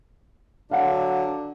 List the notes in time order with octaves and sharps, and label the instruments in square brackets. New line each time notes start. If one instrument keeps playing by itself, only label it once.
[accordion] D3 F#3 [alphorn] D4 [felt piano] F5 F#5